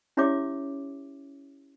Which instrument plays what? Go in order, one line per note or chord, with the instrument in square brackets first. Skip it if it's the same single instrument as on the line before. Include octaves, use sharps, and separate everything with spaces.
[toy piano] C#4 E4 G4 C#5 E5 D6